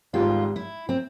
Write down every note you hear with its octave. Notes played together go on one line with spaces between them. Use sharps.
G#1 G#2 G3 F4
E4
C4